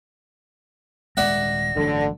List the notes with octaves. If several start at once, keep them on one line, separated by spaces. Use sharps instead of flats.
D#1 G#3 D5 E5 F#5 A#6
A1 G2 D3 F#3